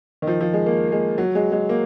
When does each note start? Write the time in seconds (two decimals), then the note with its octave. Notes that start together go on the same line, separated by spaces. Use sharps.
0.22 D#3
0.27 F3
0.41 F3
0.53 G#3
0.66 A#3
0.92 G#3
1.18 F#3
1.35 G#3
1.52 G#3
1.69 A#3